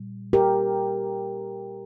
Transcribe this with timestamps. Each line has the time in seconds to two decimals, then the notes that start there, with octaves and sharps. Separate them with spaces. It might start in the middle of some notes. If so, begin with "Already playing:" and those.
Already playing: A#2 G3
0.33 G4 A#4